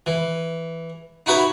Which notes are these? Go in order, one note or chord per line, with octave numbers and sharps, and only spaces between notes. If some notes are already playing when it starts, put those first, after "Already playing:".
E3
D#4 E4 F#4 B4 C#5